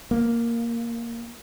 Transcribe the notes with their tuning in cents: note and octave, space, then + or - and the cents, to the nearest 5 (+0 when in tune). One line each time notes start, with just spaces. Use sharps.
A#3 +0